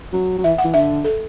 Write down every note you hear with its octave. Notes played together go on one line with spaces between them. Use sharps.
F#3
F#3
E3 E5
F#5
E3
D3 E5
A4